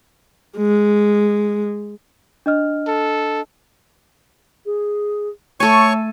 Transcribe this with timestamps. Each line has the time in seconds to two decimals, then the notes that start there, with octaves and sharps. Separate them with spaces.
0.58 G#3
2.46 D4 D#5 F6
2.87 A4
4.65 G#4
5.60 A3 A4 C#5 G#5 C#6